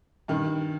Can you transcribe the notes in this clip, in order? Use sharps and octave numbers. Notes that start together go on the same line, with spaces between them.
G2 D#3